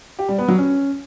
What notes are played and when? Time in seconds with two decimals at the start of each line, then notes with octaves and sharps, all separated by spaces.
0.19 G4
0.29 G3
0.38 B3
0.48 F#3
0.58 C#4